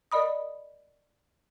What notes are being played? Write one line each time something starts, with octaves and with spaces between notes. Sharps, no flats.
A#4 D5 D#5 B5 D#6